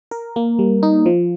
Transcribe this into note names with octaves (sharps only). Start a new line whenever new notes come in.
A#4
A#3
G3
D#4
F3